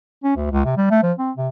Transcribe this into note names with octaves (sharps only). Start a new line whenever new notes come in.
C#4
D2
C#2
C3
G3
A3
F3
C4
C3